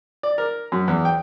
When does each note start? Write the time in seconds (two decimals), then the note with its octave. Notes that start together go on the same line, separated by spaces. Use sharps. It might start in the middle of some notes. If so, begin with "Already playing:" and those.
0.23 D5
0.38 A#4
0.72 F#2
0.88 E2
1.05 G5